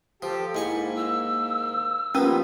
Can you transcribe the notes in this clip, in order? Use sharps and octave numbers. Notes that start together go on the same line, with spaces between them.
F3 G4 A4 G5
G#2 A#3 E4 G#5 C#6
E6
F3 G3 A#3 B3 C#4